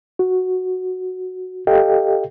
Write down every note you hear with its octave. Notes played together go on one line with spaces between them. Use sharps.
F#4
G4 A4 D#5 F5 G5